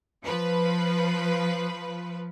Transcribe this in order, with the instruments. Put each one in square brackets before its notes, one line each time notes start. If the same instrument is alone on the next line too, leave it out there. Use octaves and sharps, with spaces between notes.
[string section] F3 B4